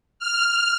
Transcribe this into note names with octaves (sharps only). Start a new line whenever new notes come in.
F6